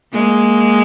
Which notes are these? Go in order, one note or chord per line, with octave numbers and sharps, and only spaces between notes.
G#3 A#3